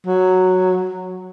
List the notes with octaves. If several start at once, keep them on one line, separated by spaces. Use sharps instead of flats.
F#3